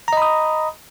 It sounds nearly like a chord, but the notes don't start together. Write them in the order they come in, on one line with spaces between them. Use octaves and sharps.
A#5 D#5 B5 D#6